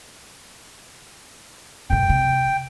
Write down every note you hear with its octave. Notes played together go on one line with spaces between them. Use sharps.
F#2 B2 G5
C3